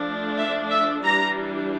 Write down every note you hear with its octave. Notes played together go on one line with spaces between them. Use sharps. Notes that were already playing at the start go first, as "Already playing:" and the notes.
Already playing: F3 A3 D4
E5
E5
E3 G3 D4 A#5